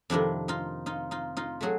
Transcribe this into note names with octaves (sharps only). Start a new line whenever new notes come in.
F2 C3 D#3 D4 E4
D#4 F4
D#4 F4
D#4 F4
D#4 F4
F#3 A3 F#4 G#4